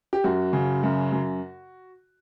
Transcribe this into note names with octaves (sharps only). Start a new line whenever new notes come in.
G4
F#2 F#4
C#3
F#2
F#2